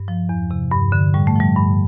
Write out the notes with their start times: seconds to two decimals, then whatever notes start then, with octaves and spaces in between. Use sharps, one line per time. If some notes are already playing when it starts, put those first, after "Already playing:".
Already playing: G2
0.08 F3
0.29 E2
0.51 C3
0.71 G2
0.92 D3
1.14 A2 G3
1.27 A3
1.35 F3 G3
1.57 G2